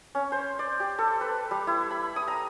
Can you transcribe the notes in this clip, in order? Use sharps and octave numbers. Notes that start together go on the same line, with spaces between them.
C#4
C5
D5
G4
A4
B4
G3
E4
B5
D#6
A#5